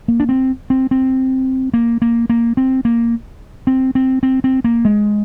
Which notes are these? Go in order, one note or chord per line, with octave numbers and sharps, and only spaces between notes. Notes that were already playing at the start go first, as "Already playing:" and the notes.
A#3
D4
C4
C4
C4
A#3
A#3
A#3
C4
A#3
C4
C4
C4
C4
A#3
G#3